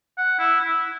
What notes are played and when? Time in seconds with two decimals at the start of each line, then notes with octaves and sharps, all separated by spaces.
0.17 F#5
0.39 E4
0.61 E4